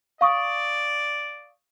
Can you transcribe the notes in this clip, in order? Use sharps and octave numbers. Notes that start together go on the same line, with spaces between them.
D5 F5 C#6 D#6